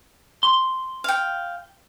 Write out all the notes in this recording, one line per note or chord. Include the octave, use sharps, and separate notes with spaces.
C6
F5 G5